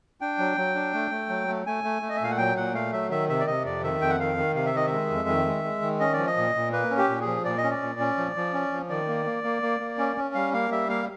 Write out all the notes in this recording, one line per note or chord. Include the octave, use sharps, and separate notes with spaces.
D4 G5
F#3
F#3
D4
A3
A3
F#3
A3
A3 G#5
A3
A3
D#5
E5
A#2 F5
F#5
F#3 G5
A#2 F#5
A3 F5
F#3 E5
D#3 E5
C3 E5
D5
C3 D#5
F2 D5
D#3 E5
F2 G5
F#5
D#3 F5
D#3
C3 F5
E5
D#3 D#5
E5
G#3
F2
D#3
G#3
G#3
D#3
C#4 D#5
D5
F3
D#5
A#2
A#2
A#3 B4
C#4
G4
A#2
G#4
F3
A#2 D5
D#5
C#4
D5
A#2
C#4
F3
F3
C#4
F3
D#3 D5
A#3
A#3
A#3
A#3
A#3
C#4
C#4
G3 F5
A#3 F5
G3 E5
A#3 F5